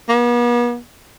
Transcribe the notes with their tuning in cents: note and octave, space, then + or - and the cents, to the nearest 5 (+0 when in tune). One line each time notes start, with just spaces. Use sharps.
B3 -45